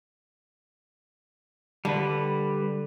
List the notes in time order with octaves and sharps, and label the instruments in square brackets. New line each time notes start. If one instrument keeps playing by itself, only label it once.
[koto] D3 [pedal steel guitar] G3 B4